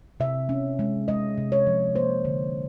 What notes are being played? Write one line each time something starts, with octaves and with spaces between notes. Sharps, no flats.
C3 E5
C#4
G#3
G#3 D#5
C3
C#5
F3
A#3 C5
D3